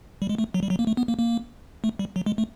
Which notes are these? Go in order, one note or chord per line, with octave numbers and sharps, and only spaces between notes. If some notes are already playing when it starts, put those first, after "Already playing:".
G3
G#3
A3
F#3
G3
F#3
A#3
A3
B3
A#3
A#3
A3
G3
F#3
G#3
A3